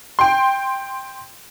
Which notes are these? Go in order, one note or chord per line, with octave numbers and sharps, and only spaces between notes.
G5 C6